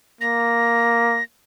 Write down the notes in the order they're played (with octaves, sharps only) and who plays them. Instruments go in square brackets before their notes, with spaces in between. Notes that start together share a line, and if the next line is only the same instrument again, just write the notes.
[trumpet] A#3 [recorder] A#6